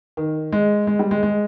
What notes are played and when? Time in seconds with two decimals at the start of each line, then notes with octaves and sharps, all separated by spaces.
0.17 D#3
0.52 G#3
0.87 G#3
0.99 G3
1.11 G#3
1.23 G#3